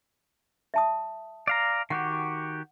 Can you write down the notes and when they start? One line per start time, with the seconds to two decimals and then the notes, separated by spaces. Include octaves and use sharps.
0.74 E5 A5 D#6
1.48 D5 F5 A#5
1.90 D#3 F#4 G4 F#5